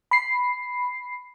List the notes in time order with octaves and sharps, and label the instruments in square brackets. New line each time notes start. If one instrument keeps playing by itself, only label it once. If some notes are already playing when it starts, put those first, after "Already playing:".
[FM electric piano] B5 C7